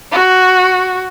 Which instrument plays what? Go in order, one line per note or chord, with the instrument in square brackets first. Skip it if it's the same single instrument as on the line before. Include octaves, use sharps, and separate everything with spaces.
[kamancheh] F#4